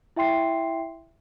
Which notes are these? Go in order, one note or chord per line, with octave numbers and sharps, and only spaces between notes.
E4 E5 G5 C6 C7